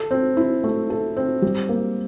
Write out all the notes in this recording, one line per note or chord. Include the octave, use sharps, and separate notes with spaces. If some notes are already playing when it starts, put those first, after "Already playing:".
Already playing: A4
C4
E4
A3
A4
C4
G3
A#3